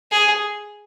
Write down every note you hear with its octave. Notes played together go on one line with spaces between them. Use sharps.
G#4